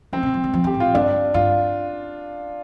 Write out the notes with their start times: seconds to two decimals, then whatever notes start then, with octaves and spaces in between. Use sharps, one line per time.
0.13 F3 C4
0.23 C3
0.34 F3
0.44 G3
0.53 F3
0.64 D3
0.67 G4
0.74 A2
0.80 F4
0.94 G2 D4
1.34 G2 F4